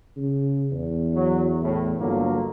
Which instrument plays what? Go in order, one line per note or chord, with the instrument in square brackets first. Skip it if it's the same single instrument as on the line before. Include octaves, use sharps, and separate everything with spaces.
[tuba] C#3
E2
[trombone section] F#3
A2
[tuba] G1 [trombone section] D3 F#3 A#3